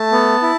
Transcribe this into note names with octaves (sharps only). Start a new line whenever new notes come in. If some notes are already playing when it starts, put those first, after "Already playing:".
Already playing: A3 A5
B3
E4